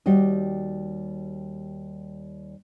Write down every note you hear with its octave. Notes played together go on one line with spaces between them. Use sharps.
D#2 G3 F#4 G4 D#5